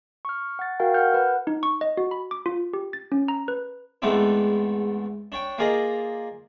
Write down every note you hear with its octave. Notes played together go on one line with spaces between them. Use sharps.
C#6 F6
F#5 A6
F#4 A#4 F5 G5
F#5 F6 G6
B4 F#5
D#4
C#6
D#5
F#4
B5
D6
F4
G4
A6
C#4
A#5
B4
E2 G#2 A3 B3 C4 D4
D4 C#5 G5
A#3 F4 G#4 D5 D#5 A#5